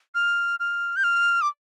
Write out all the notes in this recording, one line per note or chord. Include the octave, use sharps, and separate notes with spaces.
F6
F6
G6
F6
D6